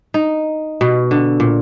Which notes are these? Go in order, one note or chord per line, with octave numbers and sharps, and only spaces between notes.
D#4
B2
D3
A#2